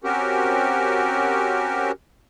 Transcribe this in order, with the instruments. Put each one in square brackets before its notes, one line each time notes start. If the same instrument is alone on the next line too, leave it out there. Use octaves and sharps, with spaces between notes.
[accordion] C4 C#4 F#4 G4 A#4